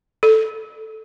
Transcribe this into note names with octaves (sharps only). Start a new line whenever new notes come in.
A4